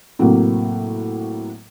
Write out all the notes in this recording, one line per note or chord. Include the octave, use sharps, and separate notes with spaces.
A2 C3 F#3 A#3